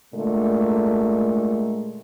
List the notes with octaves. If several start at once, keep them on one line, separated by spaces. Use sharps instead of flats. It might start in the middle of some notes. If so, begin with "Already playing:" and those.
A#2 D3 G#3 A3